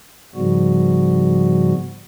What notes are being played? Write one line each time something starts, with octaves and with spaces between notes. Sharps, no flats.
G#2 C#3 F3 G3 B3 F#4